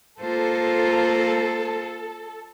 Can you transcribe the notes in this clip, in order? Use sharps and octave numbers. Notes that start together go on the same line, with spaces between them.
A#3 F4 A4 C5